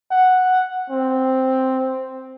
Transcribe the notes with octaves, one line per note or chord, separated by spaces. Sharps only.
F#5
C4